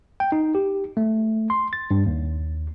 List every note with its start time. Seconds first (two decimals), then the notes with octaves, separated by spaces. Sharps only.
0.20 G5
0.32 D#4
0.55 G4
0.97 A3
1.50 C6
1.73 A6
1.91 G2
2.06 D#2